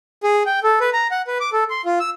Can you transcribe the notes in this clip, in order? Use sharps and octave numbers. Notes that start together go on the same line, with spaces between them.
G#4
G5
A4
B4
A#5
F#5
B4
D6
A4
C6
F4
E6